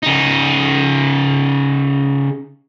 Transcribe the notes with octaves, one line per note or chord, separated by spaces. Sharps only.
C#3 D#4